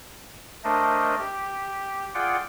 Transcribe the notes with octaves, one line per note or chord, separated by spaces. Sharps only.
A3 D4 A#4 C5 D#5
G4
F4 G#4 D5 F#5 G5